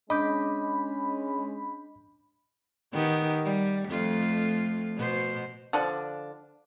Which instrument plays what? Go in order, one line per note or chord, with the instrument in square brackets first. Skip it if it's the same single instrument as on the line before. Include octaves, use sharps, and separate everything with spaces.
[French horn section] G#3 C#4 [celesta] D4 G6 [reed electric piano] D#5 D6 [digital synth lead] B5
[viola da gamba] D#3 B3 G4
G3
F2 A3 F4
B2 C5
[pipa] D3 F3 D4